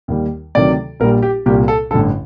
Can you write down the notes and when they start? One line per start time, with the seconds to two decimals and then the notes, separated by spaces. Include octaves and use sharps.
0.08 D#2 D#3 G3
0.55 D2 C3 D#3 F#3 D5
1.00 A#1 A#2 G3 A#4
1.22 G4
1.46 C2 A#2 G3 G4
1.68 A4
1.91 A1 G2 D3 A4